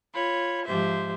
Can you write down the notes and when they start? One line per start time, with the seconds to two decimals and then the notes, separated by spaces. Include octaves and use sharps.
0.13 F4 C#5 B5
0.65 G#2 F3 G4 C5 E5